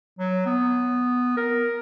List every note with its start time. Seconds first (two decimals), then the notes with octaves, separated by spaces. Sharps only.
0.19 F#3
0.46 B3
1.37 A#4